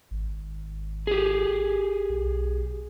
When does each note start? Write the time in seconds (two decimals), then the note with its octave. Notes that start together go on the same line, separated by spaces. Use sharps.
0.11 G#1
1.07 G4 G#4
2.10 B1